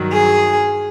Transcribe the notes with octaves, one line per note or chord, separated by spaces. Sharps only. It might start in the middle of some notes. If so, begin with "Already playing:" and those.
Already playing: G2 D#3 F#3
G#4